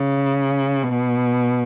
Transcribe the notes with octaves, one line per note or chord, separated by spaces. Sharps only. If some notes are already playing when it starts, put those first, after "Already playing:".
Already playing: C#3
B2